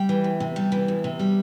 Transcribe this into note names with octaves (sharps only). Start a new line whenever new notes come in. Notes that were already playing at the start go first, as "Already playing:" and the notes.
Already playing: G3 G5
E3
E2
C3
G3
E3
E2
C3
G3